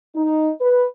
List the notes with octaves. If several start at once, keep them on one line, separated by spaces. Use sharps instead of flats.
D#4
B4